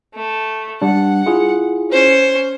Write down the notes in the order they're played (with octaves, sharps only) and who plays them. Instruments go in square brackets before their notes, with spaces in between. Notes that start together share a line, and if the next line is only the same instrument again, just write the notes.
[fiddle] A3
[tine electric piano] G3 D4 [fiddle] F#5
[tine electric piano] E4 F4 G#4
[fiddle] C#4 C5